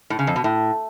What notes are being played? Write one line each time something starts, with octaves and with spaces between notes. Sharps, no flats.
A2
C#3
F2
B2
A2